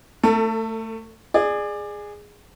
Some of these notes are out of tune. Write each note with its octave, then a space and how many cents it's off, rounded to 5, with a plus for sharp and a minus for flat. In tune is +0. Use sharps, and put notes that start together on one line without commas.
A3 +15 A4 +40
G#4 -5 D5 +25